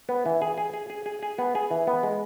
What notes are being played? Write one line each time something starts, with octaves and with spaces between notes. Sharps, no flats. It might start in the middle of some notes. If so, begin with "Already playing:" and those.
B3
E3
G#4
G#4
G#4
G#4
G#4
G#4
B3
G#4
E3
B3
G#3